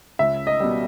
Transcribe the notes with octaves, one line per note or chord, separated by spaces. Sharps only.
C#2 E5
D#5
B2 G3